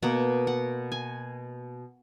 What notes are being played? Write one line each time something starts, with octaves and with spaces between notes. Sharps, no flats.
B2 A#3 F#5
F#5
G#5